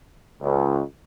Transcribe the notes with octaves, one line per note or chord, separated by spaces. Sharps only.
C#2